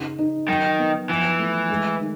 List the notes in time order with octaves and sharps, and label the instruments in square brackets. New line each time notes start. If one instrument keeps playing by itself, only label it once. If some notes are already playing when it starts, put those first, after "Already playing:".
Already playing: [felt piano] C#3 D#4
D#4
[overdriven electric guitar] D#3 [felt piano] F#3
[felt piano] B3
[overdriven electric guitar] E3 [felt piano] F3
[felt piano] A3
G#3
D#3